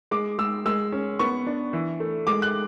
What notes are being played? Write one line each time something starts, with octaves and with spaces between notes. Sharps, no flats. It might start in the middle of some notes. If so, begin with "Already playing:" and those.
G#3 D6
G#3 E6
G#3 E6
C#4
B3 C#6
D4
E3
A3
G#3 D6
F#6